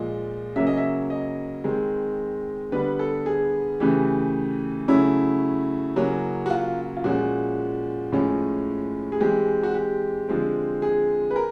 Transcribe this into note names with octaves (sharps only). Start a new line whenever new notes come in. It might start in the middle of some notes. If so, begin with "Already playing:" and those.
Already playing: A#2 F3 G#3 D#5
C#3 F#3 A#3 C#4 E5
D#5
E5
D#5
D#3 G#3 C4
D3 G3 B3 B4
A4
G#4
C#3 E3 A3 G4
C#3 F#3 A3 C#4 E4
C#3 F#3 A#3 C#4
F#4
F4
F4
A#2 F3 G#3 C#4 F#4
A2 F3 G#3 C#4
G#4
E3 G#3 C4 G4
F#4
G4
D3 F3 G#3 C4
G#4
B4
A#4